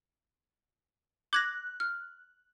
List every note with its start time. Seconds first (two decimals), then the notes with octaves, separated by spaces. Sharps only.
1.33 D6 F#6 G#6 A#6
1.80 F6